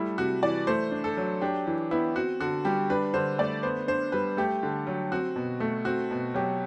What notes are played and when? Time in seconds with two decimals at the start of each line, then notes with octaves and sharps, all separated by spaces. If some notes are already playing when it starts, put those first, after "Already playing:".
Already playing: G3 A3 E4
0.18 C3 F#4
0.43 E3 D5
0.67 A3 C5
0.92 D4
1.04 A4
1.17 F#3
1.41 D4 G4
1.67 E3
1.91 B3 E4
2.16 C4 F#4
2.40 D3 F#4
2.65 G3 G4
2.90 D4 B4
3.14 D3 C5
3.38 A3 D5
3.63 B3 C5
3.88 D4 C5
4.12 G3 B4
4.37 A3 G4
4.63 D3
4.87 F#3
5.12 C4 F#4
5.36 B2
5.60 A3
5.85 C4 F#4
6.11 B2
6.34 F#3 G4